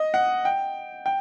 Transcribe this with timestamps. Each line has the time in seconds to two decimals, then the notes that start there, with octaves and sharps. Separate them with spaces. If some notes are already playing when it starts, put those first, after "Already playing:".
Already playing: D#5
0.14 F#5
0.45 G5
1.06 G5